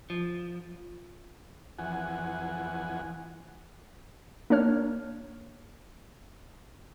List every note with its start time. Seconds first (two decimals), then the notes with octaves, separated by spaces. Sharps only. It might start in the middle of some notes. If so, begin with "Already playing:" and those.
0.10 F3
1.79 F2 E3 F#5 G#5
4.50 A#3 D4 C#5 F6